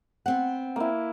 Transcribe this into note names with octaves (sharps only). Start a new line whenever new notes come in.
B3 C4 F#5
A#3 E4